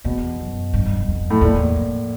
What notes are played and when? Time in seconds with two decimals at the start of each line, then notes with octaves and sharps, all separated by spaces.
0.05 E2 B2
0.40 F#2
0.73 G2
0.85 G2
0.96 F#2
1.08 F2
1.30 A2
1.41 E2 A#2
1.76 F2